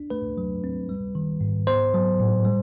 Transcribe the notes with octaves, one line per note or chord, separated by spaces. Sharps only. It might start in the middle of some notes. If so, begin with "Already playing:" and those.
Already playing: D4
A3 B4
F#3
C4
G3
D#3
G#2
B3 C5
F#3
A2
G3